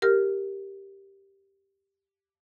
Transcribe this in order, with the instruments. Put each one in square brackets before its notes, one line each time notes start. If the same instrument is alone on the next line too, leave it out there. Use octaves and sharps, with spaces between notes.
[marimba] G4 A#4 F6